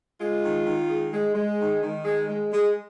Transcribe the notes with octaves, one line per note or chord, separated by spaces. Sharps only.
G#3 F4
D#3
D#3
G#3
G#3
G#3
D#3
D#3
G#3
G#3
G#3